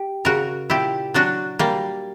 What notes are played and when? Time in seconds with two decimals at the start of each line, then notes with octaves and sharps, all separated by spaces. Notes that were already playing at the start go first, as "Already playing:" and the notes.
Already playing: G4
0.25 C#3 F#4 A#4
0.70 A#2 E4 G4
1.14 F#3 D4 F#4
1.59 G3 A#3